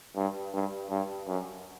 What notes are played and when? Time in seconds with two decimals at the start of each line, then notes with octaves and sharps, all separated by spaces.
0.16 G2
0.54 G2
0.91 G2
1.27 F#2